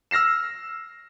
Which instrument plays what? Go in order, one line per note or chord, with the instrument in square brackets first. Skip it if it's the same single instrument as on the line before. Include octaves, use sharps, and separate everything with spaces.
[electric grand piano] E6 F6 A#6 C7 E7